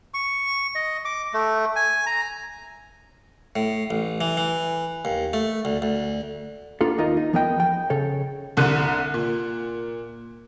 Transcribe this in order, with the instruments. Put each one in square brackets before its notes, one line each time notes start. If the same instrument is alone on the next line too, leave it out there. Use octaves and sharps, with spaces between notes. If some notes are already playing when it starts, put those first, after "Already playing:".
[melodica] C#6
D#5
D6
A3
G#5
A#5
[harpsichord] A2
A1
E3
E3
D#2
A3
D2
D2
[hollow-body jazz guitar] A#3 B3 D4 F4 A4
D#2 D#4 F4 A#4 D#5
D#4
E2 F3 B3 A#4 D#5 G5
G5
C#3 A4 C#5
[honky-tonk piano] C2 D3 F#6 D#7
A#2